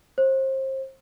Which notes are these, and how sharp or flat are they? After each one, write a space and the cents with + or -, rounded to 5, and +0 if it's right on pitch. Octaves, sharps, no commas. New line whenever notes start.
C5 +30